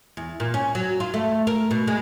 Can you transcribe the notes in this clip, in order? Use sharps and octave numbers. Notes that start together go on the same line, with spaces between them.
E2
A#2
C#4
F#3
F4
A3
A#4
B2
G#3